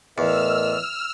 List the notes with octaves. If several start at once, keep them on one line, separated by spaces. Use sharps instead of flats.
E2 A2 A#4 D#5 E6 F6